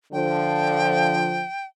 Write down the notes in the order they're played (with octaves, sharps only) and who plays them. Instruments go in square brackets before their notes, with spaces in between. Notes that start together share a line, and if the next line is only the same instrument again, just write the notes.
[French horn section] D3 F3 [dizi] G5